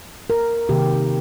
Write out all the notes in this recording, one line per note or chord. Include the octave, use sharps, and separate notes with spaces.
A#4
C3 D#3 A#3 G4